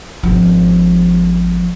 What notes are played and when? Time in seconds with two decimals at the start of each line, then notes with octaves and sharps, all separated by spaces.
0.23 G#1 F3